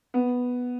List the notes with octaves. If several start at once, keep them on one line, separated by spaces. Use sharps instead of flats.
B3